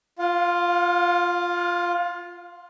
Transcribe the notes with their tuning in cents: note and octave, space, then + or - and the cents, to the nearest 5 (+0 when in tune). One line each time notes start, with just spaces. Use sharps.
F4 +0 F5 +35